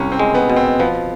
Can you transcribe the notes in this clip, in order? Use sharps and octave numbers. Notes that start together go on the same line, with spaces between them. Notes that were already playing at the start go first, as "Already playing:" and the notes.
Already playing: C2 C#4
C4
G#3
B3
B2
C4
F3 B3